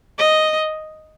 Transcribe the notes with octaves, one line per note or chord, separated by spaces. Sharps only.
D#5